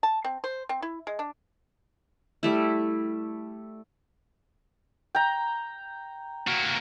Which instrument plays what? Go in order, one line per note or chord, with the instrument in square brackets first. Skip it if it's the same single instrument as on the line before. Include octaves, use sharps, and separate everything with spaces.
[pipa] A5
C4
C5
C4
E4
G#3
D4
[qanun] G3 A3 E4
[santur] G5 A#5
[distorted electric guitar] A#3 F#4